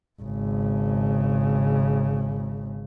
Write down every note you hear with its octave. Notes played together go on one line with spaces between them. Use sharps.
G#1 C#3